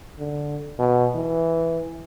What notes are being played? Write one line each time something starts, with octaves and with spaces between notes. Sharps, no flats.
D3
B2
E3